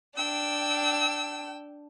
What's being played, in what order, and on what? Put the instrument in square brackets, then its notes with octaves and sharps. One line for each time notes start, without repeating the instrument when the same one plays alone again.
[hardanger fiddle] D4 [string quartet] G5 E6